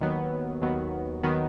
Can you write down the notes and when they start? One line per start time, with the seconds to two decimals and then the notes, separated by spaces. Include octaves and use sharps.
0.01 D#2 D#3 F#3 B3
0.61 D#2 D#3 F#3 B3
1.23 D#3 F#3 B3